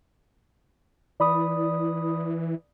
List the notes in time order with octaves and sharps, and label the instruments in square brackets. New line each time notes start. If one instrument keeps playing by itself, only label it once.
[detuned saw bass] E3 [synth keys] D5 B5 D#6